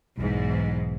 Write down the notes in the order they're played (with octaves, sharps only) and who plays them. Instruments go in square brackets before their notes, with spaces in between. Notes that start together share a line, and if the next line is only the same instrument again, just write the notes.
[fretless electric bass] B1 [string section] E2 G#2